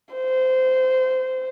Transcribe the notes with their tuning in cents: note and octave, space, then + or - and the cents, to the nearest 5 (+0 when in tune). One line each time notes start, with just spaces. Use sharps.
C5 -20